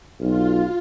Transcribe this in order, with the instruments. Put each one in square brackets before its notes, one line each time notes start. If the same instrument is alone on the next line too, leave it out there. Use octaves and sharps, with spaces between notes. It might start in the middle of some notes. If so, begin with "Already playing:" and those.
[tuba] B1 [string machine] F4